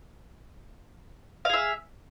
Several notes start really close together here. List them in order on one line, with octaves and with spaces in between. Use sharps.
F5 G#4 E5